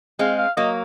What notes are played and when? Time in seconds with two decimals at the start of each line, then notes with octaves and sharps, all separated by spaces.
0.19 G#3 C4 F5
0.38 F5
0.57 F#3 A#3 D#5